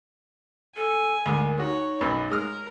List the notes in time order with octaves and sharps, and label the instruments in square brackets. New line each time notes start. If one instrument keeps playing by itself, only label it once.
[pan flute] A4 [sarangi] G#5
[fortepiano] D2 G#2 [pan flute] A#4
[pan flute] D#4 [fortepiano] F#4 [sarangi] C#5
[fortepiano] B1 F#2 B2
[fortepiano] G#3 D#6 F6 [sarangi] A#4